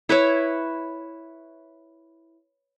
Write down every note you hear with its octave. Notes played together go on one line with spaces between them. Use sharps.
E4 B4 C#5 E5